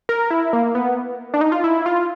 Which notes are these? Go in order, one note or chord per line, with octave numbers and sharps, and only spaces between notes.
A#4
E4
A#3
B3
D4
D#4
F4
E4
F4